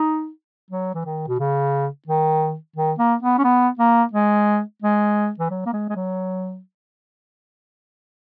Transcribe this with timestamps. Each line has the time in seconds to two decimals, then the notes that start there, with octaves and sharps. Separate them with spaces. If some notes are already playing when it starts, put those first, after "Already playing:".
Already playing: D#4
0.71 F#3
0.95 E3
1.05 D#3
1.28 B2
1.39 C#3
2.07 D#3
2.76 D#3
2.99 A#3
3.23 B3
3.38 C#4
3.44 B3
3.79 A#3
4.13 G#3
4.82 G#3
5.39 E3
5.50 F#3
5.66 A#3
5.73 G#3
5.89 G#3
5.96 F#3